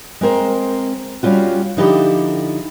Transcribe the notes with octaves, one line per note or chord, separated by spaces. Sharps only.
G#3 C4 A#4 C5
G3 C#4 F4 F#4
D3 F3 D#4 E4 G4 A4